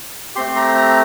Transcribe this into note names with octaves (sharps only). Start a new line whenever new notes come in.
A3 C4 G4 C6
A#5
A#5